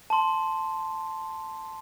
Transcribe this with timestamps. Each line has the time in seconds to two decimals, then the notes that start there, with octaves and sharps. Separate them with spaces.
0.10 A5 C6